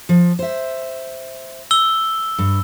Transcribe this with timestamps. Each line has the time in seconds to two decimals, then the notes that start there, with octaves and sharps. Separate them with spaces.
0.09 F3
0.39 C5 E5
1.71 E6 G7
2.38 G2